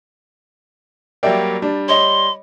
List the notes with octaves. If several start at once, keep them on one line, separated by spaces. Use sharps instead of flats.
F#3 G3 A#3 D5 E5 G5
G3 D4
C#5 D#5 C6